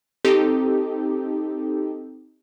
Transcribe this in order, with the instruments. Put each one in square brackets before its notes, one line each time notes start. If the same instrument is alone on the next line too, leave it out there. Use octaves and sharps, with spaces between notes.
[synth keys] C4 D#4 G4 A4